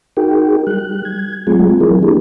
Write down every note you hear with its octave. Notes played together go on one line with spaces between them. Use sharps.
D#4 F#4 G#4 A#4 G5
G3 F#6
G#6
F#3 G#3 A3 C4 F4 G#4
E3 F#3 E4 G#4 A#4
A#3 D4 G4 G#4